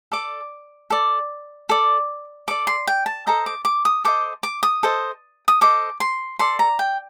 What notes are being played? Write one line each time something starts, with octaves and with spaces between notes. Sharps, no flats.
A4 D5 D6
A4 D5
A4 D5
A4 D5 D6
C6
G5
A5
A4 C5 D#5 A#5
D6
D6
D#6
A4 C5 D#5 D6
D6
D#6
A4 C5 D#5
D#6
A4 C5 D#5 D6
C6
A4 D5 C6
A#5
G5